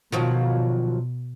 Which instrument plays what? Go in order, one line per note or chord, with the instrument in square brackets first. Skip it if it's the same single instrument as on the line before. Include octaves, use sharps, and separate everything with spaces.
[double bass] B2 [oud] D#3 F3 F#3